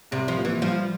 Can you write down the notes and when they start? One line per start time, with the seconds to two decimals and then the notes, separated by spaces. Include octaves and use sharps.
0.11 C2 C3
0.28 F3
0.37 A#2
0.45 E3
0.62 F3 G3